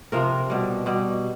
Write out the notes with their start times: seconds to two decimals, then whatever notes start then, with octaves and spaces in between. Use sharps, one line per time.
0.12 C3 F3 A#4
0.50 B2 G3
0.86 B2 G3